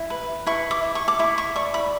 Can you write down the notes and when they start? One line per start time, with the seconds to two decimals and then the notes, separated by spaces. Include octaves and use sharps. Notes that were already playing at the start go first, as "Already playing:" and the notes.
Already playing: E4
0.10 B4
0.46 E4 C#6
0.71 D6
0.83 E4
0.95 C#6
1.08 D6
1.19 E4 C#6
1.38 C#6
1.56 D5 C#6
1.74 B5